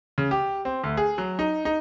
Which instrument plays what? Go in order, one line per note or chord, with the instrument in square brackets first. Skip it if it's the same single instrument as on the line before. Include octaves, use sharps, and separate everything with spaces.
[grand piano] C#3
G4
C4
D2
G#4
F#3
D#4
D#4